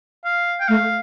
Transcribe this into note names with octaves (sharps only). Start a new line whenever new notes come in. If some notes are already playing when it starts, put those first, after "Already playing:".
F5
G5
A3 F5